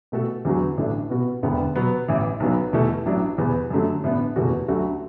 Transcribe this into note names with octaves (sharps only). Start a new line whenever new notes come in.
B2 A3 F#4 A4
E2 D3 F#3 B3 F#4
A1 A2 E3 A3 D4
B2 B3 F#4
E1 D2 D3 B3
B2 F#3 B3
A1 A2 E3
B1 B2 F#3 B3
E2 B2 A3 E4 A4
A1 A2 F#3 D4
E2 B2 B3
F#2 D3 F#3 A3
A1 A2 E3 B3 D4
F#1 E2 B2 A3 F#4
D2 D3 F#3 A3 F#4